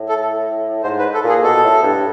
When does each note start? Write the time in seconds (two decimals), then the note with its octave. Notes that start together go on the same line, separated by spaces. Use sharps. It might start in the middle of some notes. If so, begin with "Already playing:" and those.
Already playing: A2
0.09 A4
0.84 G#2 C5
0.99 B4
1.14 A4
1.24 A#2
1.29 G#4
1.44 B2 A4
1.64 A2
1.83 G2